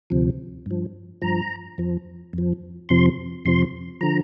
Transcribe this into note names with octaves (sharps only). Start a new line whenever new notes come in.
D2 C3 F3
G2 F3
G2 F3 A#5
F2 F3
F2 F3
F2 C3 F3 C6
F2 C3 F3 C6
D3 F3 A#5